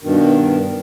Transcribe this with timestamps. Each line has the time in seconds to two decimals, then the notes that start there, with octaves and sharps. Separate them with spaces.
0.01 G2 B2 D#3